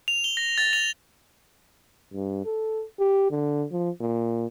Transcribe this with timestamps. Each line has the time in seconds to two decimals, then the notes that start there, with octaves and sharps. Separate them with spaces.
0.08 F7
0.24 G7
0.37 A#6
0.58 A6
0.73 F7
2.14 G2
2.45 A4
3.00 G4
3.30 D3
3.71 F3
4.00 A#2